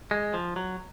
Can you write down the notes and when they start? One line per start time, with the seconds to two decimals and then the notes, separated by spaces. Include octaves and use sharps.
0.11 G#3
0.34 F3
0.56 F#3